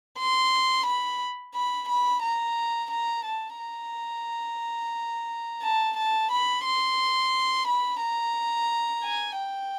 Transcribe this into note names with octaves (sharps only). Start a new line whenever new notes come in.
C6
B5
B5
B5
A#5
A#5
A5
A#5
A5
A5
B5
C6
B5
A#5
G#5
G5